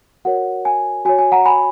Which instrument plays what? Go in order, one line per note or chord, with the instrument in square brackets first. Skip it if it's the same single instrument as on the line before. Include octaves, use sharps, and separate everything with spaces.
[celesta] F#4 A#4 C#5 F#5
G#5
F#4 C#5 G#5
G#5
F#5 A#5
G#5 B5